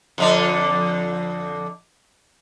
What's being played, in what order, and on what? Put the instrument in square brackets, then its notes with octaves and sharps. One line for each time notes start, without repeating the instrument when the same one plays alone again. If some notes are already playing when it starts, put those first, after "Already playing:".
[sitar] F2 D3 D4